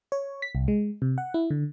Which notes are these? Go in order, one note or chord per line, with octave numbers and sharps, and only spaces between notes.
C#5
B6
C2
G#3
C3
F#5
E4
D3